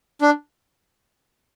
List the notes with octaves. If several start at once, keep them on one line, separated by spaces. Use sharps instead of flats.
D4